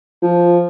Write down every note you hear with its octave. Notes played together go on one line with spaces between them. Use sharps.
F3